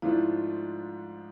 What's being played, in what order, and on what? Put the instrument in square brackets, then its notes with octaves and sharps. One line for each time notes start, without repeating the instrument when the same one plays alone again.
[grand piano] G#2 F3 A3 D4 F4 [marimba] E4